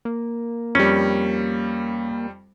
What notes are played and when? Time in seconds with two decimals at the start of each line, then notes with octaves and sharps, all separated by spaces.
0.05 A#3
0.75 F2 G3 C#4